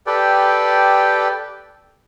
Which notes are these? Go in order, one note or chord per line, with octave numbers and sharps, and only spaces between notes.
G4 A4 B4 D5 G5